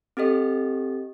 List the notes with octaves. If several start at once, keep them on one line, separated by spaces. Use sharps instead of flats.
C4 G4 A4 D#5